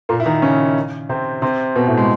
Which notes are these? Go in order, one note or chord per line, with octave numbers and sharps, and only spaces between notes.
A#2 A#3
E4
D#3 D#4
C#3 C#4
C3 C4
C3 C4
B2 B3
A2 A3
G#3